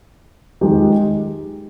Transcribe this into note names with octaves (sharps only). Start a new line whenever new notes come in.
D#3 G#3 D#4 G4